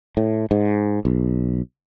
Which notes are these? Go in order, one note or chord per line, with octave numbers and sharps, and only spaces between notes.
A2
G#2
B1